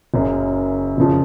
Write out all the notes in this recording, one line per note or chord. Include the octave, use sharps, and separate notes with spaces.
F#1 F#2 C#3
F#1 F2 C#3 F3